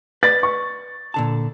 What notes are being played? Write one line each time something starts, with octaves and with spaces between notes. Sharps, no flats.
B4 D5 A6
C#6
A#2 D3 A5